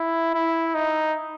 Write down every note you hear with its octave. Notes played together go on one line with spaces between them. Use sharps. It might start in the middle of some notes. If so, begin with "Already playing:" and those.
Already playing: E4
E4
D#4